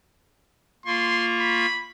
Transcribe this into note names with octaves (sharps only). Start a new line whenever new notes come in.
A#3 F4 C6 C#6
B5